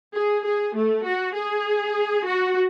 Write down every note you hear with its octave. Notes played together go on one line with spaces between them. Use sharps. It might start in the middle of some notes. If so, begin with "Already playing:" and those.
G#4
G#4
A3
F#4
G#4
F#4